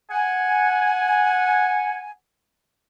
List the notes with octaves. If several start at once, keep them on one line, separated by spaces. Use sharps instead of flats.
F#5 G#5